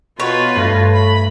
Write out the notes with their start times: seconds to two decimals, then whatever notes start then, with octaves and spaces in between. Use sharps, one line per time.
0.20 B2 F4 B4 C#5
0.56 G2 A3 A#6
0.94 B5